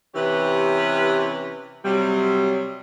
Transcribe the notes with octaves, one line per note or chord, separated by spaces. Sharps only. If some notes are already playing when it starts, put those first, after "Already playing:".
C3 E3 C#4 E4 G4 B4
C3 F#3 G3